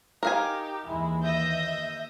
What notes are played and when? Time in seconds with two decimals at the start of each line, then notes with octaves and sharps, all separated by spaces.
0.23 D#4 G4 A#4 F5 G#5
0.86 D#2 E3 G#3 E4
1.23 D#5 E5 G6 A#6